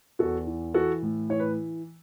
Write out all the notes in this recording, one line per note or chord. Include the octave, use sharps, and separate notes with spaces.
E2 F#4 A4
E3
E3 F#4 A4
A2
E3 C#5
B4